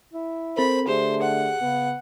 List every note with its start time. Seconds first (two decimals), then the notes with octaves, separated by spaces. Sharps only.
0.13 E4
0.57 C4 A4 A#4 C5 B5
0.87 D3 A3 G4 G#4 C5
1.22 F#5
1.62 C#3 B3